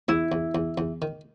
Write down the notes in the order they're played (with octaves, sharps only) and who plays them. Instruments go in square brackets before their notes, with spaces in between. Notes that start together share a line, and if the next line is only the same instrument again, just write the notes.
[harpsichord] E2 [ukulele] E4
[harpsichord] E2
E2
E2
D#3